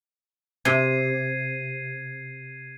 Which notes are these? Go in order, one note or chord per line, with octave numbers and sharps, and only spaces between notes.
C3 G#6 C7 D#7